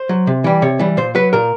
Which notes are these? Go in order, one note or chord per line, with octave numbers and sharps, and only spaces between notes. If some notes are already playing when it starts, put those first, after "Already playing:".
Already playing: C5
F#3
C3
E3 G3
C3 C#5
E3 G3
A#2 C5
F#3 B4
A#2 A#4